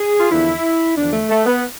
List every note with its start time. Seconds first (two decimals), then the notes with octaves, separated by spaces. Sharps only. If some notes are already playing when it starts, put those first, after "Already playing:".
Already playing: G#4
0.19 F4
0.30 E2 D3 F3 E4
0.97 E2 D3 F3 D4
1.12 A3
1.29 A3
1.46 B3